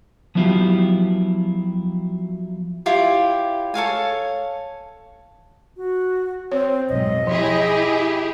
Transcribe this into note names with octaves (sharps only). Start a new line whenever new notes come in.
F3 F#3 B3 E4 F4 G4
E4 F4 G4 C#5
A4 C#5 F5 G#5
F#4
C4 C#5
B1 F2 G#2 D#5
F3 E4 G4 G#4